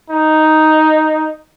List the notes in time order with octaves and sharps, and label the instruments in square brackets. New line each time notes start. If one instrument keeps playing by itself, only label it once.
[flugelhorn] D#4